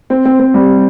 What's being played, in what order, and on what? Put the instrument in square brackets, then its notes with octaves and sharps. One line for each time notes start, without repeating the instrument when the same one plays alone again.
[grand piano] C4
C4
C4
G3